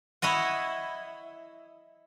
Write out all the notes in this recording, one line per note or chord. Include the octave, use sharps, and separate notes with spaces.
E4 C#5 D#5 F#5